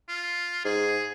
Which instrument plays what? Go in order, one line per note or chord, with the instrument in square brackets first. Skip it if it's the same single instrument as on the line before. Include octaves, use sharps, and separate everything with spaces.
[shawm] F4
[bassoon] G#2 [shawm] G#4